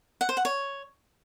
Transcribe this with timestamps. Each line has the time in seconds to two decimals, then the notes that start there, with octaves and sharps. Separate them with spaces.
0.21 F#5
0.29 C5
0.37 F#5
0.45 C#5